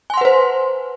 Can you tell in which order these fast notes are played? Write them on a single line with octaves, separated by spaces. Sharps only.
G#5 C6 F#5 B4 C5